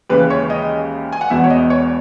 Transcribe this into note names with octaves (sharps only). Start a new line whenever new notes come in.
D#2 C#3 E3 G#3 B4
C#5
D#5
G#5
F#5
E1 E2 B2 E5
C#5
D#5
C#5